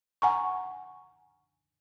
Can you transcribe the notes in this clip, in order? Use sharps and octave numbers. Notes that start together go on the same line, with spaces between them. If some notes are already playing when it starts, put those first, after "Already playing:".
F#5 G#5 A#5 C#6